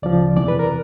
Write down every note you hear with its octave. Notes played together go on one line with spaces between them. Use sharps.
D2 C#3 F3 D5
E2 C3 E3 D5
B4
A#4